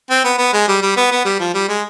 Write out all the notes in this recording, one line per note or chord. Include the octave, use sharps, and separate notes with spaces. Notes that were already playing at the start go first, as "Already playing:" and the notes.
C4
B3
B3
G#3
G3
G3
B3
B3
G3
F3
G3
G#3